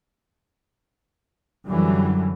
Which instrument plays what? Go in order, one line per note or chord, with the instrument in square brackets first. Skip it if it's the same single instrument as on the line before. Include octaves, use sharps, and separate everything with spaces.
[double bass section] F#2 D3 E3 F#3 G3